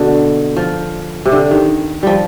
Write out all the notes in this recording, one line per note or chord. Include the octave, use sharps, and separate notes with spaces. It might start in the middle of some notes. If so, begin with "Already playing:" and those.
Already playing: B2 D3
F3
C3
D3
D#3
F3 G3